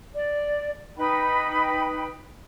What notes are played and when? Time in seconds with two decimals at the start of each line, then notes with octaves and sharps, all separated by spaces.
0.13 D5
0.96 D#4 B4 G5 B5